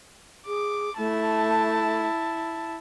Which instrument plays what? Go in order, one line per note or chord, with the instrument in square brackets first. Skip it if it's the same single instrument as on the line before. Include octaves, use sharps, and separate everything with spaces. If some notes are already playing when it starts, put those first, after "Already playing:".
[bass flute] G#4 [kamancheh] D6
[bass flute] A3 [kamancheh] E4 A5